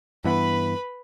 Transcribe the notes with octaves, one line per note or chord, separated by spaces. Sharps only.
G2 E3 B3 B4 B5